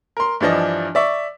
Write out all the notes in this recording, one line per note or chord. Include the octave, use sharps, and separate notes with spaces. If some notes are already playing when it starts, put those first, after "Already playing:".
A#4 C6
G2 E3 F3 D4 D#5
D5 E5 C#6